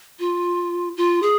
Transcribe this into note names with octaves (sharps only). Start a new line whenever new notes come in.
F4
F4
G#4